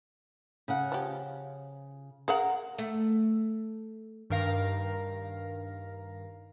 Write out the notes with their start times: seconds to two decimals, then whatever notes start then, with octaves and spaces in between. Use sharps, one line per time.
0.68 C#3 F#5
0.92 F3 G4
2.28 G#4 A#4 F5 F#5
2.78 A3
4.30 G2 D#3 A#4 F5 A#6